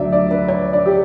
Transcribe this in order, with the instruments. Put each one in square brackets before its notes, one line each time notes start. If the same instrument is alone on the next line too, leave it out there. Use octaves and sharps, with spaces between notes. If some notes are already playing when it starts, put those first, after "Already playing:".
Already playing: [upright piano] D2 D3 F#3 D5 E5
D5
B4
C#5
D5
G4